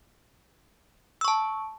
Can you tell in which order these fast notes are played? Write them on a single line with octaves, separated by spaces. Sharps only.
E6 C#6 A5